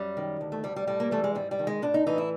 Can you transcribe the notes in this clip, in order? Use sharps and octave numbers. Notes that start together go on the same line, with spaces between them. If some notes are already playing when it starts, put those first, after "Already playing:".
Already playing: F#2 G3
D#3
D2
A3
D2 G3
G3
A2 G3
A#3
E3 A3
G#3
G#2 G3
G3
D#3
G#3
A2 D4
D#4
E3 D#4
E4